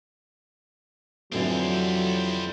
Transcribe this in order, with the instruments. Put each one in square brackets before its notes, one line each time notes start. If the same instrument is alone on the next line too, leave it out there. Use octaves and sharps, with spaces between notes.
[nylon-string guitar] F2 D3 E3 [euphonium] F#3 [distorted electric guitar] G3 C4